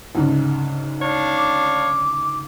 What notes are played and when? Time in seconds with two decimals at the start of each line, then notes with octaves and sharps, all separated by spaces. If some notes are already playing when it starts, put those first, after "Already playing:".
0.15 D2 G#2 C#3
1.01 D4 C#5 F5
1.38 D6